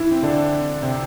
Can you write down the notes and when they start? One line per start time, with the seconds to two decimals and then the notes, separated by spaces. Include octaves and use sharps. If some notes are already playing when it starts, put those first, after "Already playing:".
Already playing: E3 E4
0.11 C4
0.22 D3 D4
0.82 C3 C4